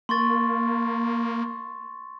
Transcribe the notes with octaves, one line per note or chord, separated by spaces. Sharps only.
A#3 C6 C#6 A6